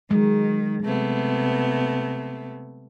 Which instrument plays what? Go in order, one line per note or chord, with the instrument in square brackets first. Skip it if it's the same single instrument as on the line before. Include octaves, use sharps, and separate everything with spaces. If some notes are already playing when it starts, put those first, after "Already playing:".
[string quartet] D#3 [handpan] F#3 G#3
[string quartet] C3 A3 B3